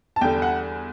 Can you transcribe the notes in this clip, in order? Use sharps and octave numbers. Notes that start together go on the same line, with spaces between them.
A5
E2 D3 G3 G5
F#5